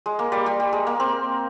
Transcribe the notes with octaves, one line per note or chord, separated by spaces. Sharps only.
G#3
A#3
G3
G3
G3
G#3
A#3
C4